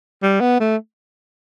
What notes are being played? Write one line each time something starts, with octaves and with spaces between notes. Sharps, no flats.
G3
B3
A3